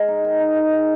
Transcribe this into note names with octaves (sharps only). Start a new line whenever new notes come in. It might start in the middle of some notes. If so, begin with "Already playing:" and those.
Already playing: G#3 A#4
D#4
D#3
D#4
G#3
D#3